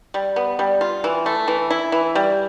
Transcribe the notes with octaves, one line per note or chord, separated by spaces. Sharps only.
G3
B3
G3
F4
E3
A3
E3
E4
E3
G3